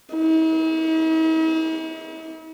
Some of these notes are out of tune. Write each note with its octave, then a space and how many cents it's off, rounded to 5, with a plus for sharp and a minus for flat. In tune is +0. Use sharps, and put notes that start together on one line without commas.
E4 -45